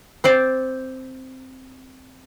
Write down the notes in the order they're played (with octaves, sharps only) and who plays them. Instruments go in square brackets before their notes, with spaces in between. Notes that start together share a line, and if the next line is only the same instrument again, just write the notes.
[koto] C4 C5 D5